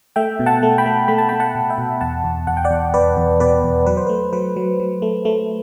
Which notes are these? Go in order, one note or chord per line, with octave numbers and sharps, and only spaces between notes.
A3 E5 G5
B2
F#5 A5
A3
G5 B5
A3
A3 B5
A5
A3 G5 B5
F#5 A5
B2
E5 G5
B2
E2 F#5 A5
E2
E2 F#5
G5
D5 F#5
E2
E2 B4 D5
E2
B2 B4 D5
E2
F#3 B4
C5
A3 B4
F#3 B4
F#3
F#3
A3
A3